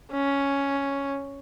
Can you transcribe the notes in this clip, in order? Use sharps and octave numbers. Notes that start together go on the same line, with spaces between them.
C#4